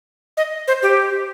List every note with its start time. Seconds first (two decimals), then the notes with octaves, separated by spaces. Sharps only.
0.37 D#5
0.68 C5
0.82 G4